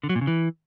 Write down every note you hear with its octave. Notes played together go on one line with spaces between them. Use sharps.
D3
F#3
A#2
C#3
E3